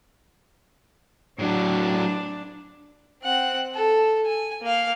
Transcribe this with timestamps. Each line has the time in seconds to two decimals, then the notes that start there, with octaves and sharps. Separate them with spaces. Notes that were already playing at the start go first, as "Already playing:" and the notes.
1.39 A2 F#3 D4
3.23 C4 F#5
3.75 A4
4.26 G#5
4.62 A#3 F5